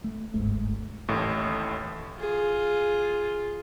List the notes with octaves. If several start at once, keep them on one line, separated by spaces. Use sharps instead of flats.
A3
D1 G1 G#2 A3
A1 D#2 A2
F4 G#4